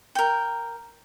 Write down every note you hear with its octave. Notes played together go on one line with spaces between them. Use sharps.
A#4 G5